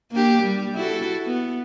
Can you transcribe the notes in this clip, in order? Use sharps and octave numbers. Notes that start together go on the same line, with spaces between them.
A#3 D4 G4
G3
E4 F#4 A4
B3